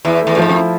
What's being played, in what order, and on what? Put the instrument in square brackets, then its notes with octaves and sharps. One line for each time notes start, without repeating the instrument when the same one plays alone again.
[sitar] E2 [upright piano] E4
[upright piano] A3
[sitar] E2
A2
[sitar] G#2 [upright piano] F3
[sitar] F2
[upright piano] E4